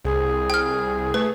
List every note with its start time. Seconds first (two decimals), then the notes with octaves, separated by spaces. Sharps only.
0.04 C2 G#4
0.50 G5 F6
1.14 A3 B4